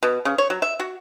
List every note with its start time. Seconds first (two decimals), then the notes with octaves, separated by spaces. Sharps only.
0.03 B2
0.25 C#3
0.38 C#5
0.50 F#3
0.62 E5
0.80 F#4